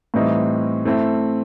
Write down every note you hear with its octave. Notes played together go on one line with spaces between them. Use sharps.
A2 E3 G3 C4 D#4
A3 C4 E4